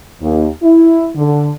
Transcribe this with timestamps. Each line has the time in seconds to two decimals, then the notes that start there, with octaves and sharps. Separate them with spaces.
0.22 D#2
0.63 E4
1.16 D3